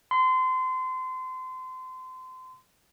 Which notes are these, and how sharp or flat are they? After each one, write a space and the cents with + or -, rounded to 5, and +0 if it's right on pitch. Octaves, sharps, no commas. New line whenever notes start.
C6 -30